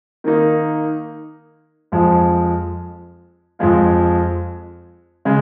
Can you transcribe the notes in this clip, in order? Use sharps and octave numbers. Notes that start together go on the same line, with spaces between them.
D#3 A#3 D#4
F2 F3 G#3
F2 F3 G#3 F4
C#3 G#3